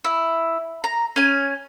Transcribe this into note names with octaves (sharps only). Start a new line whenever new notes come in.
E4
A#5
C#4 G#5